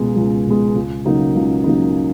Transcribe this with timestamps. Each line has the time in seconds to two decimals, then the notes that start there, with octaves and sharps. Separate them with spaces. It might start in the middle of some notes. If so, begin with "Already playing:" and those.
Already playing: C#2 B2 G#3
0.16 C#2
0.47 B2 G#3
0.76 C#2
1.05 C#3 F#3 A#3 D#4
1.35 C#2
1.64 C#3 F#3 A#3 D#4